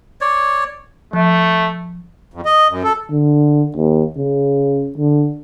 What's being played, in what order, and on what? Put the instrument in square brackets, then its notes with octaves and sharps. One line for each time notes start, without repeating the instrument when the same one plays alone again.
[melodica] C#5 D5
[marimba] F3 [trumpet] A3
[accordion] F2
D#5
F#2
A4
[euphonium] D3
D#2
C#3
D3